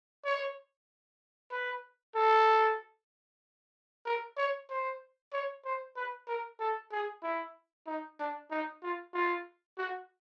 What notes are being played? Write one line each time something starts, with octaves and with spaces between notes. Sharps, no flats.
C#5
B4
A4
A#4
C#5
C5
C#5
C5
B4
A#4
A4
G#4
E4
D#4
D4
D#4
F4
F4
F#4